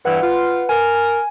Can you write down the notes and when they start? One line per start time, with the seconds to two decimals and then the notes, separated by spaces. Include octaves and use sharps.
0.05 G2 E3 B4 F#5
0.22 F4
0.69 A#4 G#5
0.95 G#5